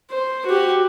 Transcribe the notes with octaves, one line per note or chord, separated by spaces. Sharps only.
C5
F#4 G4